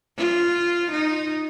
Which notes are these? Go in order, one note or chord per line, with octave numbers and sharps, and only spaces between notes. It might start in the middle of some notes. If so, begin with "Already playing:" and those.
F4
D#4